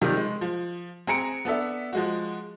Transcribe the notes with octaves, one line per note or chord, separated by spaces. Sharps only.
C3 D#3 F3 G3
G#3
F3
C4 G#4 G#5 A#5 C#7 D7
B3 D4 A4 E5
F3 G#3 F#4